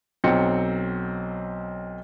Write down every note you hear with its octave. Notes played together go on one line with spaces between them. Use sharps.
B1 F#3 C4 C#7